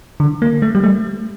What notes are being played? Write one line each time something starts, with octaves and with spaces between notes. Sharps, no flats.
D3
A#3
A3
G3
A3